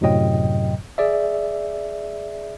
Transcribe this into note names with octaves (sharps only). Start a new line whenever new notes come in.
F#2 A2 C3 F#3 D#5 G5
G#4 D5 E5